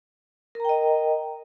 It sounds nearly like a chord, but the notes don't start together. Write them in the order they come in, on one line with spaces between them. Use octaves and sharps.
A#4 A#5 G5 D#5